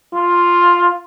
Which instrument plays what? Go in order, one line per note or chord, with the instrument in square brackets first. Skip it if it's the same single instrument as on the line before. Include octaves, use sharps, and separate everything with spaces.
[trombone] F4